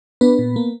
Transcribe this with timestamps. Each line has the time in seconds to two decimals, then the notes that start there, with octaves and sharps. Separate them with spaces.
0.21 B3 D4 B4
0.39 A#2
0.56 A#3